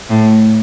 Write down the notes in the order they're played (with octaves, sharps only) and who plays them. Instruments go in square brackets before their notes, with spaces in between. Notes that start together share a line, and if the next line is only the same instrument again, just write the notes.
[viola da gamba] A2